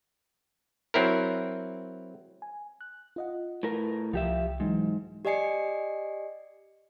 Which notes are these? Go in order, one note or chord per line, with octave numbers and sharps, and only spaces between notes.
F#3 C4 E4 A#4
G#5
F#6
F4 D#5 F#5
A2 A#4 B4
C2 F3 G4 E5
G#2 E3 F#3 D#4
G4 D5 D#5 G#5 C7 C#7